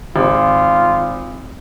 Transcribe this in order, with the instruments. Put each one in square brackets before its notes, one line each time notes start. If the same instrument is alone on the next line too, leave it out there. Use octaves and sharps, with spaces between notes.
[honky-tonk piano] G#1 [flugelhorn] F4